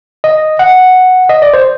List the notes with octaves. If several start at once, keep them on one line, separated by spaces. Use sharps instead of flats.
D#5
F#5
D#5
D5
C5